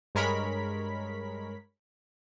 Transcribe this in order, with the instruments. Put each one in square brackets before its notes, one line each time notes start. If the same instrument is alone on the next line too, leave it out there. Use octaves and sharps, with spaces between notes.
[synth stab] G2 G#3 A#4 C#5 B5 B6